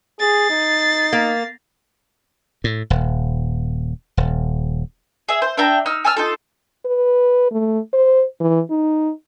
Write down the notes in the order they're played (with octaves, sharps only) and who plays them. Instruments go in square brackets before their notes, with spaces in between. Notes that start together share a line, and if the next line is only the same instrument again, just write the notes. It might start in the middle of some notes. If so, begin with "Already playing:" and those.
[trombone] G#4 [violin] A6 C7
[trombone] D#4
[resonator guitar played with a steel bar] A#3
[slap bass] A2
D#1
D#1
[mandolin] G#4 E5
C5
D4 E5 G5 A#5
D#4 E6 F6
G#5 A5 E6 F6
D#4 F4 A4
[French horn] B4
A3
C5
E3
D#4